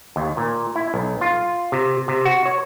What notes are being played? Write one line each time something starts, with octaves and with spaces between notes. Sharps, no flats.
D#2
A#2
E4
B1
F4
C3
C3
F#4
C#5